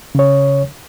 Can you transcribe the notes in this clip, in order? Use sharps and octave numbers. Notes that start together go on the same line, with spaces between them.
C#3 C#5